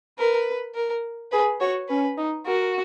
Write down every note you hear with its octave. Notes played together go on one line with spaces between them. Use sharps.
A#4 B4
A#4
G#4 B4
F#4 C#5
C#4 B4
D#4
F#4 A#4